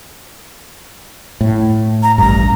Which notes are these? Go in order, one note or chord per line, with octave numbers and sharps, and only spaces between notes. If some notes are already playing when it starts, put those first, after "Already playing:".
A2
A#5
A1 G2 A#5